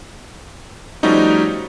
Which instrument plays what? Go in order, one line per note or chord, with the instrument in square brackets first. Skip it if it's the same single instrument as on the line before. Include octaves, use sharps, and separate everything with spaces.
[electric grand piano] F3 G3 A3 C#4 D#4 F#4